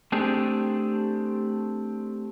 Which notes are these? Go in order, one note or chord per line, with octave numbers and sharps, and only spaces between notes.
A3 C4 D4 G4 G#4